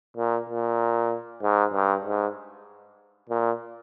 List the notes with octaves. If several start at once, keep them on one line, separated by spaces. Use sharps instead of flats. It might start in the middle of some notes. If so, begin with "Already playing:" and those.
A#2
A#2
G#2
G2
G#2
A#2